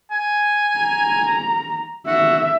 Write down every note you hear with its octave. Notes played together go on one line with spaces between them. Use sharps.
G#5
A#5
F#4 E5